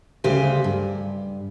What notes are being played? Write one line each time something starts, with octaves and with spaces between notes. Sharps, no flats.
D2 C#3 G3 G4 C5 G#5
G2